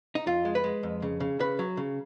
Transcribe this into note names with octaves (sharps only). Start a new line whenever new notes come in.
D#4
F2 F4
G#3
B4
G#3
F2
C#3
C#3
C#3 B4
F#3
C#3